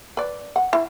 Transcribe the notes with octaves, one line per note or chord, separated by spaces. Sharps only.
B4 D5
F#5
E4